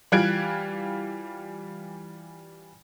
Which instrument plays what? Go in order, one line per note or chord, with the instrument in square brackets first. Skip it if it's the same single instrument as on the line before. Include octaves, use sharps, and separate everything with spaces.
[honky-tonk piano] E3 G3 F4 F#6 G#6 D7